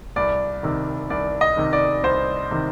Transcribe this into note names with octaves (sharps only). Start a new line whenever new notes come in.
C2 D5
C3 D#3
C2 D5
D#5
C3 D#3
D5
C2 C5
C3 D#3